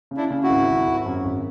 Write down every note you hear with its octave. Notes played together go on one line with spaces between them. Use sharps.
C#3
D4 E4
C#3
E4 F#4
G#1
G#1
G#1
F#2
G#1